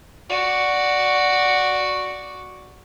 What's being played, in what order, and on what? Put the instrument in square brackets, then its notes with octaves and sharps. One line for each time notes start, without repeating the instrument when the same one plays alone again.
[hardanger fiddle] F#4 D5